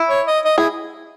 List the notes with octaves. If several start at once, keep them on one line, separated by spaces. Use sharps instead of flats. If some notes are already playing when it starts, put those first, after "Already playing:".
Already playing: E4
C#5
D#5
D#5
E4 G#4